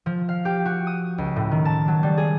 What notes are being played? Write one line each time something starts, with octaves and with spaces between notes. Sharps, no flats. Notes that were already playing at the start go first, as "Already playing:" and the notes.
F3
F5
G4
F#4
D#6
C#2
A2
D#3
A5
F#3
G3
G#4